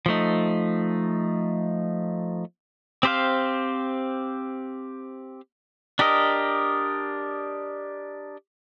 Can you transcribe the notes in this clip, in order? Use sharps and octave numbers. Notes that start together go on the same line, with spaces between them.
F3 A3 D#4
C4 G4 C5 F5
D4 G4 A#4 D#5